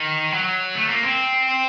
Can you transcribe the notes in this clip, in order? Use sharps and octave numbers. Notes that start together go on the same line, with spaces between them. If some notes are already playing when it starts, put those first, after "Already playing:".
Already playing: D#3
F#3
A3
A#3
C4